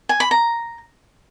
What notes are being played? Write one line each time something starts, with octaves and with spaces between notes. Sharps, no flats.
G#5
B5
A#5